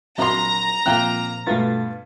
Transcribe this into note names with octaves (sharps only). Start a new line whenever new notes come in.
A#1 F#3 C4 A#5 C6
A#2 F3 A#3 C4 G5 F#6
G2 B2 A3 B3 F4 A6